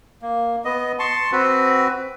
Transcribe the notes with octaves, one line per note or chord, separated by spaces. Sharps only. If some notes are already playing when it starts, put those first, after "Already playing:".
A#3
B3 D#5
A5 C6 C#6
C4 F#4 B4